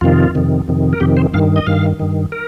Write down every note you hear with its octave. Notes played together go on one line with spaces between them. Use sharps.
F2 C3 D#3 F4
F2 C3 D#3
F2 C3 D#3
A#4
F2 C3 D#3 G4
C5
G2 D#3 F5
D#5
G2 D#3 F5
G2 D#3
A#4